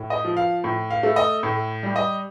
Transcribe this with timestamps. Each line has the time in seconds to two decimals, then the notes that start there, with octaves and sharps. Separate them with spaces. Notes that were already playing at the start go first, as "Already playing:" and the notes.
Already playing: A2
0.10 D#5
0.24 F3
0.37 F5
0.64 A2
0.90 F5
1.03 A3
1.16 D#5
1.43 A2
1.83 G3
1.96 D#5